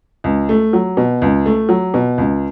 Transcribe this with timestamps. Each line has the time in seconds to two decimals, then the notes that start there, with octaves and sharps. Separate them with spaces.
0.24 C#2
0.49 A3
0.73 F#3
0.97 B2
1.22 C#2
1.46 A3
1.69 F#3
1.94 B2
2.18 C#2